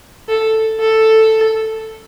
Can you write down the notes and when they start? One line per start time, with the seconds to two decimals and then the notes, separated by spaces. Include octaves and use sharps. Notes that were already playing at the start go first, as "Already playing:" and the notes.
0.29 A4
0.80 A4